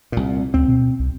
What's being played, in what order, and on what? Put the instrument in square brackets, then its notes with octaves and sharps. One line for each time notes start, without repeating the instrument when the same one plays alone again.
[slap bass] C2 A#2
[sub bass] D2 [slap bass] C4
[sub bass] B2
C2